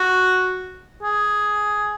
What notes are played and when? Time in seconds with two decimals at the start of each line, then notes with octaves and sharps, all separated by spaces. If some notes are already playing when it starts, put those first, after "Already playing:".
Already playing: F#4
1.03 G#4